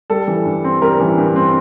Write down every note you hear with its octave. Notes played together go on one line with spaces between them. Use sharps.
G3 A4
E3
G2
C4
G3 A#4
E3
G2
C4